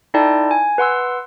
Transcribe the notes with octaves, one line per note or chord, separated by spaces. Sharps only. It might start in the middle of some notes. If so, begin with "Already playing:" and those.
D#4 E4 A4 D5 G5 A5
G#5
B4 F#5 C6 E6